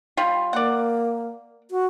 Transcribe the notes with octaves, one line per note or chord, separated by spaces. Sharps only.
G3 F4
A#3 D5 F#5
F#4